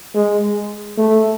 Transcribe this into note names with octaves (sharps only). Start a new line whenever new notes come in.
G#3
A3